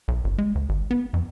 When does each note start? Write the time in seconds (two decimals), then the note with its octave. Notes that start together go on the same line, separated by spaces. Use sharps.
0.08 B1
0.24 G1
0.38 G#3
0.55 D2
0.69 G#1
0.91 B3
1.14 F2